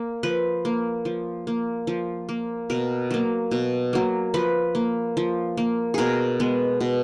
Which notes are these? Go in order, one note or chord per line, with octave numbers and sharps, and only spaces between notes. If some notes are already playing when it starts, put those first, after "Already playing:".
Already playing: A#3
F3 B4
A#3
F3
A#3
F3
A#3
B2 A#4
F#3 A#3
B2
F#3 A#3
F3 B4
A#3
F3
A#3
B2 G#4 A#4
G#3 B3
B2